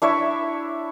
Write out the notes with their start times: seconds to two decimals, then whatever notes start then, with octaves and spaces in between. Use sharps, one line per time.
0.02 D4 E4 C#5 E5